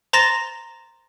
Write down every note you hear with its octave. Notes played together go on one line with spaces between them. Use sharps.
C5 A#5 C6 A6 A#6 E7